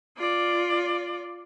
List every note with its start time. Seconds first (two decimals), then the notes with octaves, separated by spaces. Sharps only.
0.17 F4 D5